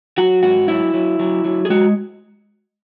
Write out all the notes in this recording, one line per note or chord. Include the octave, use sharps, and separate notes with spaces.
F#3 F#4
G#2 F#4
F#3 E4
F#3
F#3
F#3
G#4
G#3 F#4